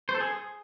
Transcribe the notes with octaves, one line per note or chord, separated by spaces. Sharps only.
C5
A4
G#4